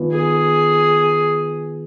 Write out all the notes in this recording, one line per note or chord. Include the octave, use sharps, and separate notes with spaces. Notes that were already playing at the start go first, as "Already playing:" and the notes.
Already playing: D#3 B3 F4 B4
G#4